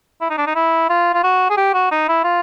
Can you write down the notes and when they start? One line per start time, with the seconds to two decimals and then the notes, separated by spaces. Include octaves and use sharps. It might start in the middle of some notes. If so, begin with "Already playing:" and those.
0.21 E4
0.30 D#4
0.38 D4
0.47 D#4
0.55 E4
0.89 F4
1.14 F4
1.23 F#4
1.50 G#4
1.57 G4
1.74 F#4
1.91 D#4
2.08 E4
2.24 F4